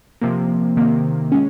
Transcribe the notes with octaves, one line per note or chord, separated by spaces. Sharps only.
C3 F3 A#3
C3 D#3 A#3
G#3 C#4